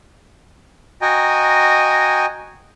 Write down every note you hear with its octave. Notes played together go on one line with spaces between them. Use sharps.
F#4 D#5 G5 G#5 A#5